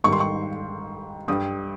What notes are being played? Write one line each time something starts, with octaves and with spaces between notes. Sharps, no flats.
G#2 D#3 G3 C#6
C6
C#6
G2 G3 D#6